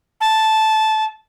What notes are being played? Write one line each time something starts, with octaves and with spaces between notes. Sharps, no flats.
A5